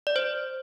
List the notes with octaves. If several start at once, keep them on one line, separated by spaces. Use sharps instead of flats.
D5
C5